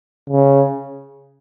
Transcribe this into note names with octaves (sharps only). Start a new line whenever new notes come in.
C#3